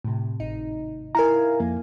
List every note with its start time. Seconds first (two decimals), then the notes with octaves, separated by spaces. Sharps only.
0.04 A2 C3
0.40 G#1 D#4
1.15 E4 A#4 F5 G#5 A#5
1.60 F2 A#3